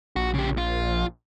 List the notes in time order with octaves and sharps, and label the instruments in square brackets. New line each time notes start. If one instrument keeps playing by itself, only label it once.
[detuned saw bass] A#1 [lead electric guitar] F#4
[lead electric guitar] C#3 G4
F4